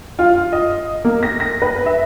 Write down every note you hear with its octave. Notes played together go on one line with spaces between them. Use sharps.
F4
D#5
A#3
A#6
A#6
B4
E5